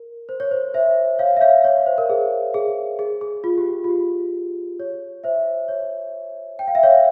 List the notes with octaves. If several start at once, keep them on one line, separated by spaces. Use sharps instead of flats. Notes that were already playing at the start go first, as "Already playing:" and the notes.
Already playing: A#4
C5
C#5
C5
C5 E5
C#5 F5
E5
C#5 F5
C#5
C5
A#4
G#4
G#4
G#4
G#4
F4
G4
F4
F4
G4
C#5
C5 E5
C#5
G5
F5
E5
C#5 F5